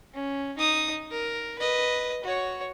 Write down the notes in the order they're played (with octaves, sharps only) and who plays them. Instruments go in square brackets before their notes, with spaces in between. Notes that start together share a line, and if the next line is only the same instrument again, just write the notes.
[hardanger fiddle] C#4
D#4 D#6
A#4
B4 D#5
F#4 C#5